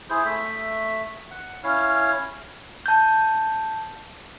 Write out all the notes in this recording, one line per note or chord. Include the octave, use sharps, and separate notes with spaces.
E4 G#4 C5
A3 E5
F#5
C#4 E4 C#5 F5
A5 G6